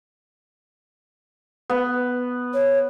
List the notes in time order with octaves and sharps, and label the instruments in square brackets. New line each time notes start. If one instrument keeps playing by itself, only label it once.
[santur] B3
[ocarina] C#5